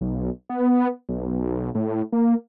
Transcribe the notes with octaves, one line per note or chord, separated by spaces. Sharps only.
B1
B3
B1
A2
A#3